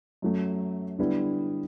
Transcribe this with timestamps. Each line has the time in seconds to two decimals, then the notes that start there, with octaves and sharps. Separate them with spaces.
0.22 F#2 F#3 A3
0.99 D3 G3 B3 E4